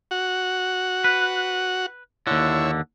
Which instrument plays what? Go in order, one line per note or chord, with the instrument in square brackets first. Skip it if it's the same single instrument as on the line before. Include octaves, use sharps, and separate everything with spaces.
[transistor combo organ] F#4 F#5
[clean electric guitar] B4
[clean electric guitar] D#2 D3 [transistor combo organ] E4 C#5